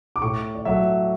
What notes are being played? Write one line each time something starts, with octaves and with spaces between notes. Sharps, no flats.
D6
A2 C#6
D5
F#3 A3 E5